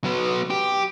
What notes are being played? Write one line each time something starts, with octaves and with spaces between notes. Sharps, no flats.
F#3 B3
G4